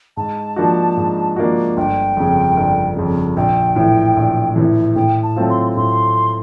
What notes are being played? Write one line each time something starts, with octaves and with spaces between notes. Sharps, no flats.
G#2 A5
F3 A#3 D4 F#4
G#2
F3 A#3 D4 F#4
G1 G5
F2 C#3
G1
F2 C#3
A#1 G5
A2 E3
A#1
A2 E3
A2 G5
A5
F#3 A3 C4 F4
C6
A2 C6